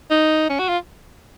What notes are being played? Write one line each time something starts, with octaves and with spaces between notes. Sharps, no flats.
D#4
C#4
F#4
F4